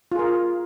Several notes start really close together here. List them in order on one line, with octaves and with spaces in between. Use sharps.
F4 G#4 A#4